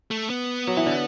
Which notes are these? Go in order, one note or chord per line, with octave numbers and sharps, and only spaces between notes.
A3
B3
F#3
E3
D3